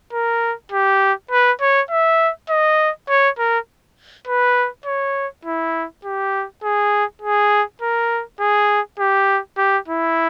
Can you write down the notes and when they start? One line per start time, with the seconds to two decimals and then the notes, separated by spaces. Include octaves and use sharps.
0.13 A#4
0.72 G4
1.31 B4
1.61 C#5
1.90 E5
2.49 D#5
3.09 C#5
3.38 A#4
4.27 B4
4.86 C#5
5.45 E4
6.04 G4
6.63 G#4
7.21 G#4
7.82 A#4
8.40 G#4
8.99 G4
9.58 G4
9.88 E4